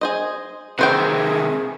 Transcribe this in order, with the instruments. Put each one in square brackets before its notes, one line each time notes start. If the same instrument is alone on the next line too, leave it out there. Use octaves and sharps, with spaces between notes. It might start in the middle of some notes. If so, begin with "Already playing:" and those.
[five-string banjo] G#4 C5 D#5
[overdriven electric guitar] C3 D#3 [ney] G#4 [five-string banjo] B4 C5 G5